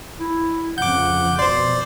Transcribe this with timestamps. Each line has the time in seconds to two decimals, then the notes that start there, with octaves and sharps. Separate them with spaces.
0.20 E4
0.78 F2 C#3 F3 F#5 D6 G6
1.39 B2 C5 D5 C6